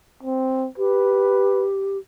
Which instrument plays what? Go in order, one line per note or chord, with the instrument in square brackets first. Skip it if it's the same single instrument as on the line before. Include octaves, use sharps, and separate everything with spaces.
[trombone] C4
[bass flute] G4 [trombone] B4